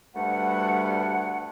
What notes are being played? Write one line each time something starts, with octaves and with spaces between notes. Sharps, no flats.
D2 G2 G3 A3 D4 F#5